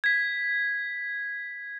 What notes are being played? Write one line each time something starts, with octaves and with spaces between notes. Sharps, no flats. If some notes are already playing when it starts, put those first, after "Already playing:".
G#6 B6